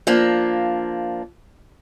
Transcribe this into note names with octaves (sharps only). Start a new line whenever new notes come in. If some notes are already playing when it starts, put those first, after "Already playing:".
F3 A#3 D4